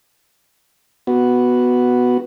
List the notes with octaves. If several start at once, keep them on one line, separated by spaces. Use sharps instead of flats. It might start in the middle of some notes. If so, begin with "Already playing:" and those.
B3 F#4